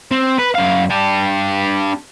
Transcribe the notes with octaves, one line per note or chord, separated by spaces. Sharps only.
C4
B4
F#2 F5
D4 G4